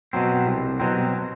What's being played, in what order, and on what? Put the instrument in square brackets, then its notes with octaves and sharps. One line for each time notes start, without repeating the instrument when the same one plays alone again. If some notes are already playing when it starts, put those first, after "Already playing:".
[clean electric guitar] B2 F#3 C4
C2
B2 F#3 C4